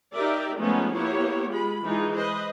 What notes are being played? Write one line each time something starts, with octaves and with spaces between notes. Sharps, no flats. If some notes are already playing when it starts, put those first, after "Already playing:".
D#4 G4 A#4 D5 E5
F3 G#3 A3 B3 C#4 D#4
A#3 B3 E4 G4 C#5
G#3 F4 B5
E3 G#3 D#4 F4
B4 C5 D#5